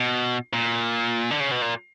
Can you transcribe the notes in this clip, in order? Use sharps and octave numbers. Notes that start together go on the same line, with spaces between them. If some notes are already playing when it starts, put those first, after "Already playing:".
Already playing: B2
A#2
D3
C#3
B2
A#2